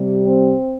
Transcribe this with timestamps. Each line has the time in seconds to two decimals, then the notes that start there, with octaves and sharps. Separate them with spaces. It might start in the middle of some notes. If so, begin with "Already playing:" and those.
Already playing: C3 G3
0.24 C4